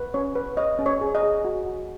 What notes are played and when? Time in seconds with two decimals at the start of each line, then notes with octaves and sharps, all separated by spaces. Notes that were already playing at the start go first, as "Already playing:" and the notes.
Already playing: B4
0.14 C#4 C#5
0.35 B4
0.57 C#5 D#5
0.79 C#4
0.86 C#5
1.01 G#4
1.15 D#5
1.23 G#4
1.45 F#4
1.66 F#4